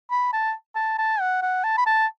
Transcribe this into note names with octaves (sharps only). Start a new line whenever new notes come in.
B5
A5
A5
A5
F#5
F#5
A5
B5
A5